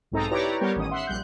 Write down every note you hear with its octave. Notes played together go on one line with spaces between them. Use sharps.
B1 G#2 C4 D#4 A4 A#5
E4 G4 B4 C#5 D5 A#5
G3 B3 G4 A#4 C#5
A1 D#3 C#4 D#6
E5 F#5 C6
A#1 G3 F#6 G6